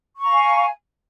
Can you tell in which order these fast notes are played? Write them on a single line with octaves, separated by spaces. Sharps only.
C#6 A#5 F5 G#5